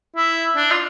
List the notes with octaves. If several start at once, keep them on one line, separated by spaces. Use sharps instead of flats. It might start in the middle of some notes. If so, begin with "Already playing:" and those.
E4
D4
F4